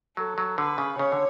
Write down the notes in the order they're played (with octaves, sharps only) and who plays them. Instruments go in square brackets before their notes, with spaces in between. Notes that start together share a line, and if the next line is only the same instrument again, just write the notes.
[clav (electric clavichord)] F#3 [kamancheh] A4
[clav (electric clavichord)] F#3
[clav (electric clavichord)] D3 [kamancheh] B4
[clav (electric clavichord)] C#3
[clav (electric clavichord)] C#3 [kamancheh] C#5
[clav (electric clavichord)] D3